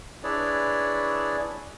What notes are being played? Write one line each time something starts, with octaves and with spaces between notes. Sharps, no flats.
D4 E4 G#4 B4 C#5 D5